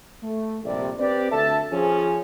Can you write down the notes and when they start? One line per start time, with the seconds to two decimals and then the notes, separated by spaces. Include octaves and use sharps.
0.23 A3
0.64 A#1 F2 C3 G3 D5 E5
0.99 C4 G4 B4 D5
1.31 D2 A4 E5 A5
1.71 F3 C#4 G#4